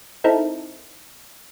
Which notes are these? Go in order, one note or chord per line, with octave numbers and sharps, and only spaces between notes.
C4 D#4 E4 A4 A#4